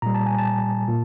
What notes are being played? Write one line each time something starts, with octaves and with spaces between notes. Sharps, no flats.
A#2 G3 A#5
A5
G#5
A5
A#2